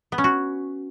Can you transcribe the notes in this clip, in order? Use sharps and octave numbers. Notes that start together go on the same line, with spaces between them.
B3
C#4
F#4